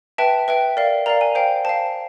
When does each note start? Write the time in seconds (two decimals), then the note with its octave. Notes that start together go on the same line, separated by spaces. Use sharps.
0.18 B4 E5 G5 A5
0.48 B4 E5 G5
0.77 A#4 D5 F5
1.06 A#4 D5 F5 A#5
1.21 G#5
1.35 C5 F5 G5
1.65 C5 F5 A5